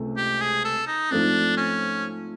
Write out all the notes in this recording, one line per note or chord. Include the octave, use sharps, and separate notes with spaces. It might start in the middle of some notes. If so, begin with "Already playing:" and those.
Already playing: C#2 C3 A3
G4
G#4
A4
D#4
G#2 F3 A3 C4 D4
C#4